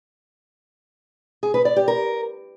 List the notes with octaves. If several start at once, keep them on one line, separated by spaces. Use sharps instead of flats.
G#4
B4
D5
G4
A#4